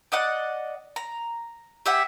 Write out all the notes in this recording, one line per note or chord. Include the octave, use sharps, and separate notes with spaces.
D5 D#5 F#5 F#6
A#5
G4 E5 F#5 G#5